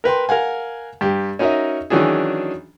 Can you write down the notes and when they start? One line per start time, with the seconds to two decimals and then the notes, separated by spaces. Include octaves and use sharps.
0.04 A#4 B4 G5 C6
0.29 A#4 F5 F#5 G#5
1.01 G2 G4
1.39 C#4 D#4 F#4 A#4 D#5 E5
1.90 D#3 E3 F#3 C#4 D4 G#4